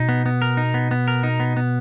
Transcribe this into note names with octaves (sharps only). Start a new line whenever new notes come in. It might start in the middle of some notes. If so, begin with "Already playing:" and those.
Already playing: B2 D#4
B3
B3
A#4
D#4
B3
B3
A#4
D#4
B3
B3